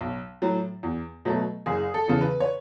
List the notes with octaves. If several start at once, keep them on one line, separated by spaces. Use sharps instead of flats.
B1
A2 F#3
E2
B2 F#3 A3
F#1 G#4
A4
E2 C#3 E3
B4
C#5